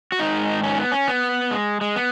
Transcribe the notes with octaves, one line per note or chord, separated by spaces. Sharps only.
F#4
G#2 D#3 D#4
C#4
B3
C#4
B3
G#3
G#3
B3